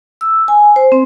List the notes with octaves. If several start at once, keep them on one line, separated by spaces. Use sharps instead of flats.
E6
G#5
C5
C4